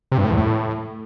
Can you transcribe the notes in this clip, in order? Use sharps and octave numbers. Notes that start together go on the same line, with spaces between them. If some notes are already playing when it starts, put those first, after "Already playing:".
C3
G2
A2
E2
A2